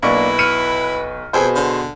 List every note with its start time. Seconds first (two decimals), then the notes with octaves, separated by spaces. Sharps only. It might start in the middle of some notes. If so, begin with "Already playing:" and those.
0.03 B1 A#3 D4 E4 B4 C#6
0.39 F6 C#7 D#7
1.33 F2 B2 G#4 B4 C5
1.56 D3